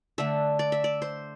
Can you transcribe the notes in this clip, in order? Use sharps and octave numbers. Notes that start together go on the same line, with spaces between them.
D3 A3 D4 E5
D5
E5
D5
C5